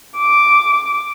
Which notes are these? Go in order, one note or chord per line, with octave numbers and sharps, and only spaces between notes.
D6